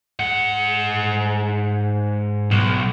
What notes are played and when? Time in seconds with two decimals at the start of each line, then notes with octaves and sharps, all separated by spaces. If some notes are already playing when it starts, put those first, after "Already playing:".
0.20 G#2 F#5
2.51 B1